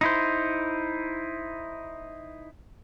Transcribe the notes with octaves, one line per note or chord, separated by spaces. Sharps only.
D#4 E4 C5